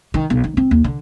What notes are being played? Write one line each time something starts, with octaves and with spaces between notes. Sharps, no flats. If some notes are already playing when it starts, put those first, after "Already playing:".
D#3
B1
D#3
C4
D#2
D3